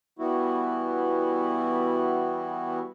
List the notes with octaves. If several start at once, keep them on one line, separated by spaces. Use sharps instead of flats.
E3 G3 B3 E4 F#4